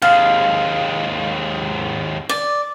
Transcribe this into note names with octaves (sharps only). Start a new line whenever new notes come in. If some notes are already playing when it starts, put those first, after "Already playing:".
D#2 G#3 F5
D5